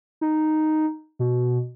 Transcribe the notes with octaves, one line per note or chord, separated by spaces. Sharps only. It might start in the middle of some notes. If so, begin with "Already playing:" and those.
D#4
B2